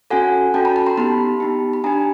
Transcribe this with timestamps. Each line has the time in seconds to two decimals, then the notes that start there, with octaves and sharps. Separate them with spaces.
0.10 C#4 F#4 A4 F#5 G#5
0.54 C#4 F#4 A4 G5 A5
0.65 A5 B5
0.76 A5 B5
0.86 A#5 C6
0.97 B3 D#4 G4 A5 B5
1.40 B3 D#4 G4
1.73 B5
1.84 D4 G4 G#5 A#5